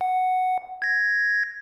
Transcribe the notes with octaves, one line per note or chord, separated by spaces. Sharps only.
F#5
G#6 A#6